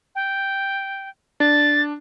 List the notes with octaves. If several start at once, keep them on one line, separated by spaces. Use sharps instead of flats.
G5
D4 A6